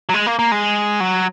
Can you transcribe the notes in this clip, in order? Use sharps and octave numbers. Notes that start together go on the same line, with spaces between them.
F#3
G#3
A#3
A#3
G#3
F#3